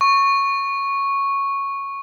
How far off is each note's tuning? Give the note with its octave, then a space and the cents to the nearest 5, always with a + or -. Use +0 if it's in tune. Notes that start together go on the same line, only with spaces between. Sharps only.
C#6 -5